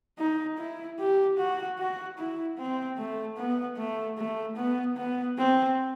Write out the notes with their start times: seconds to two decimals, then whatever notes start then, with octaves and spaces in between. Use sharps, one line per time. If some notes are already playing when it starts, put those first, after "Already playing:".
0.19 D#4
0.58 E4
0.99 G4
1.38 F#4
1.79 F#4
2.18 E4
2.58 C4
2.98 A3
3.37 B3
3.77 A3
4.18 A3
4.57 B3
4.97 B3
5.38 C4